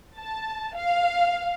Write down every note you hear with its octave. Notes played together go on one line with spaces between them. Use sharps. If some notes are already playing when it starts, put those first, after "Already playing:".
A5
F5